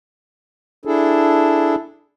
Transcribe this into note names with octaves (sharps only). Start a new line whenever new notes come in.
D4 E4 G#4 A4